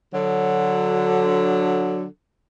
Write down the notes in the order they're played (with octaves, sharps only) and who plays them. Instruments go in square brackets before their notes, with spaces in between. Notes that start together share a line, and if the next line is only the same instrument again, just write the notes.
[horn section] D3 F#3